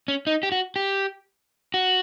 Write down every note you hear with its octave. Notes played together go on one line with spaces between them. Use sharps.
C#4
D#4
G4
F#4
G4
F#4